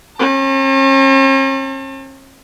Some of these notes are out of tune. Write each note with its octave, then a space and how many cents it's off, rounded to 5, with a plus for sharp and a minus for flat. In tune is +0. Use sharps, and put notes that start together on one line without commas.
C#4 -45 A5 +40